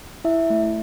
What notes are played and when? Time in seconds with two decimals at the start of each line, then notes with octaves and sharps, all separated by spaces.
0.24 E4 E5
0.50 A3